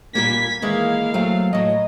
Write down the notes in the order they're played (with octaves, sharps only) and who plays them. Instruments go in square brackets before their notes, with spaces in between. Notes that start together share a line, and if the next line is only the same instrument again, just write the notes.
[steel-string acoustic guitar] A#2 G3 A#3 [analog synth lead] G#6 [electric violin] B6
[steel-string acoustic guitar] D#3 E3 G#3 [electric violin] A#3 F5
[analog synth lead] F#3 [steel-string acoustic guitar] A3 C4
[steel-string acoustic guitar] A2 F#3 [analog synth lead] D#5